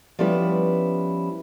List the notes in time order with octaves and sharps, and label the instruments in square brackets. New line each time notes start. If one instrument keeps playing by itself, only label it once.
[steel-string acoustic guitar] F3 G3 B3 C#4 E4 B4